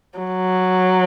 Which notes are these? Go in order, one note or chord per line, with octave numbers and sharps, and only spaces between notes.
F#3